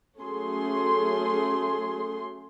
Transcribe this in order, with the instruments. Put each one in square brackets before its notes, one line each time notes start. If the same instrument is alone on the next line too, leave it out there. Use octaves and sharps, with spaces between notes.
[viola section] F#3 A3 C#4 G#4 C6